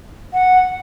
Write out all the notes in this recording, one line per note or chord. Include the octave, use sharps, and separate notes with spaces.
F#5